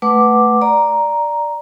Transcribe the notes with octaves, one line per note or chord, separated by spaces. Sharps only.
A3 B4 F#5 D6
D5 A#5